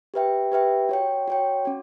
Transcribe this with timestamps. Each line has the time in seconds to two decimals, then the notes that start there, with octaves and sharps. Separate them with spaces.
0.14 G4 B4 E5 G5
0.52 G4 B4 E5 G5
0.89 F#4 C#5 G5
1.28 F#4 C#5 G5
1.65 C#4 F#4